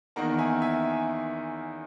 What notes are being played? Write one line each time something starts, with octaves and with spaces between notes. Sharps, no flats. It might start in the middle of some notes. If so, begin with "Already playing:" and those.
E2 D#3 A#3 F#5 A#5
E5 G#5
E5 G#5